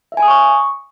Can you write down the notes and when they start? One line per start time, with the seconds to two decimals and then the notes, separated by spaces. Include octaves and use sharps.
0.12 E5
0.17 G#5
0.23 D#6
0.28 C#6